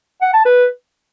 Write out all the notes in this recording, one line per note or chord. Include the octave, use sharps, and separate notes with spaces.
F#5
A5
B4